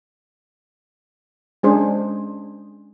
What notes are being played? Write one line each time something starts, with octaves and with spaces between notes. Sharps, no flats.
G#3 C#4 D4 G#4 C5